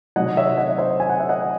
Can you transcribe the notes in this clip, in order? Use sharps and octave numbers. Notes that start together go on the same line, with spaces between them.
C3 D#3 F#3 D#5 F#5
C#5 E5
D#5 F#5
E5
C5 D#5
G#5
F#5
E5
D#5 F#5